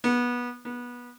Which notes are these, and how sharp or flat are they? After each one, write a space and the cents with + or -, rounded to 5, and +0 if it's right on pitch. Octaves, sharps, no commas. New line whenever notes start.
B3 -20
B3 -20